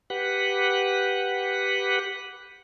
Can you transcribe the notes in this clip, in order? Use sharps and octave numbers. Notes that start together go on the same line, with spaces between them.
G4 B4 F#5